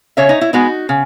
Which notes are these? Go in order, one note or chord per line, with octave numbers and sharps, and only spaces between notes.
C#3 C#5 E5
D#4
E4
G#3 B3 D#4 F#4
C#3